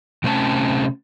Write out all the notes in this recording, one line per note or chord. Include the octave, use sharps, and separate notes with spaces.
C3 A3 C4 C#4 A5